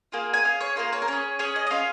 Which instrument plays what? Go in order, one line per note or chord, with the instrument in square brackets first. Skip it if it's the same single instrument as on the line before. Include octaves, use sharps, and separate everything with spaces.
[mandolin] A#3 F4 G#4
G#5
C#4 G#4 F5
C#5
A#3 F4 G#4 A#4
C#5
A#4
C#4 G#4 C#5
C#4 G#4 C#5
D#5
D#5
C#4 F4 G#4 F5